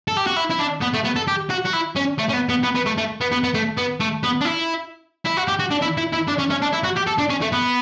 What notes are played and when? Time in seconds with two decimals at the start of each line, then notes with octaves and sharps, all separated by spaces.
0.08 A4
0.17 G4
0.26 F#4
0.36 E4
0.50 E4
0.59 D4
0.81 B3
0.93 A3
1.04 B3
1.16 A4
1.27 G4
1.50 F#4
1.65 F#4
1.73 E4
1.96 C#4
2.18 A3
2.29 C#4
2.33 B3
2.49 B3
2.64 B3
2.75 B3
2.86 A3
2.98 A3
3.21 B3
3.32 B3
3.44 B3
3.54 A3
3.77 B3
4.00 A3
4.23 B3
4.41 D4
4.45 E4
5.25 E4
5.37 F#4
5.48 G4
5.59 F#4
5.71 D4
5.82 E4
5.97 E4
6.13 E4
6.27 D4
6.38 C#4
6.50 C#4
6.62 D4
6.73 E4
6.84 F#4
6.96 G4
7.07 A4
7.18 D4
7.29 C#4
7.41 A3
7.52 B3